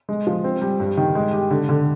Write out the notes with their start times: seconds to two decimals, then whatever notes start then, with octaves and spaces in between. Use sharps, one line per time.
0.09 G#3
0.27 F3
0.44 C4
0.62 G3
0.80 G2
0.97 D#3
1.15 G#3
1.33 G4
1.50 D3
1.69 D3